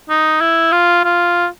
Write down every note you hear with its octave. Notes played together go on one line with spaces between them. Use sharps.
D#4
E4
F4
F4